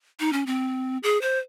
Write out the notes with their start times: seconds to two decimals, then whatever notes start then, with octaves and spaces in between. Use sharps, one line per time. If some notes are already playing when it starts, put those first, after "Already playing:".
0.20 D#4
0.33 C#4
0.46 C4
1.03 G#4
1.22 C5